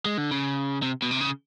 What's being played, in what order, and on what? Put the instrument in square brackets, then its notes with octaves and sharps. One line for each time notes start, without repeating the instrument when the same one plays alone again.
[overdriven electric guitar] G#3
D3
C#3
C3
B2
C3
C#3